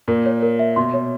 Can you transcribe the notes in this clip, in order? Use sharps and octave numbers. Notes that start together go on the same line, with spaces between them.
A#2 A#4
C#5
A#4
E5
B2 C6
C#5